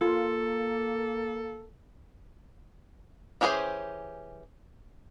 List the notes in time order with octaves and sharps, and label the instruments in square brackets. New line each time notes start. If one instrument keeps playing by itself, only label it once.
[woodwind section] A#3 [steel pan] F4 [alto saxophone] A4
[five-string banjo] E3 C#4 G4 G#4 C5